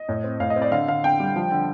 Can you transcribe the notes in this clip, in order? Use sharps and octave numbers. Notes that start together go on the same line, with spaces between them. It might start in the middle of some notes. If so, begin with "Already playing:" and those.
Already playing: D#5
A2
C4
A2 F5
D#5
C4
D5
D3 F5
D3 F5
D3 G5
G3
F3
D3